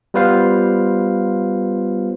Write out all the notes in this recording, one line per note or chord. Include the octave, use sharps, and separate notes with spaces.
G3 B3 F4 B4 C5 F5